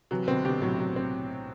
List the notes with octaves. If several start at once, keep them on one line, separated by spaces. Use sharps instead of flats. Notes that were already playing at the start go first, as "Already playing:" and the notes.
C3 E3 F#3
B2 D3 C4
B2 D3 G4
A2 C3 F#3
F#3
C4